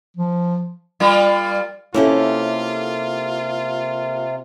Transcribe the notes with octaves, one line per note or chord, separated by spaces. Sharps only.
F3
G3 A#3 F4
C3 A#3 C#4 E4 F4 G4 A4